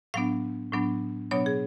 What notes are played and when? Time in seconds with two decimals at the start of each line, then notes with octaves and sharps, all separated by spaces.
0.14 A2 F#3 B3 D4 F5
0.72 A2 F#3 B3 D4
1.31 B2 F#3 B3 D4 C#5
1.46 G#4